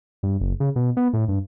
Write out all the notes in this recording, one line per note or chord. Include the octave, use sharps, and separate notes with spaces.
G2
F#1
C#3
B2
B3
A2
G2